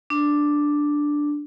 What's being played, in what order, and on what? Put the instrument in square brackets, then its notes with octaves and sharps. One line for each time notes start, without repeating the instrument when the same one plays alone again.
[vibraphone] D4